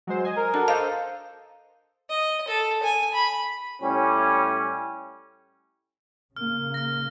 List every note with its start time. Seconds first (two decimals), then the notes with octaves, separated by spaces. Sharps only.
0.07 F#3 G#3 C5
0.25 D#5 G#5
0.37 A#4
0.54 D4 F#4 A4 A5
0.68 A4 C5 D#5 F5 G6
2.10 D#5
2.48 A4
2.83 G#5
3.14 B5
3.82 A2 G3 C#4
6.36 C#3 A#3 F6
6.74 F6 A#6